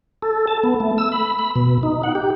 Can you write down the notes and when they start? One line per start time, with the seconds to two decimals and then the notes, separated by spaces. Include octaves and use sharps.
0.22 A4
0.47 A5
0.64 B3
0.80 A3
0.98 E6
1.12 B5
1.39 B5
1.56 B2
1.83 D#4
2.03 F#5
2.15 G4